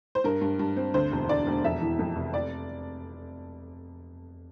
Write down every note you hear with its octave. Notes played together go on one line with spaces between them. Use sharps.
C5
G2 A#4
G2
G2
C4
D2 C5
E1
D3 D5
E1
F2 E5
E3
F2
F1
D5